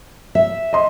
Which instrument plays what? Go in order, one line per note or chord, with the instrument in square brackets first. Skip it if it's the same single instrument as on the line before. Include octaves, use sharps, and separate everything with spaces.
[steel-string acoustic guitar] E5
[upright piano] D#5 C6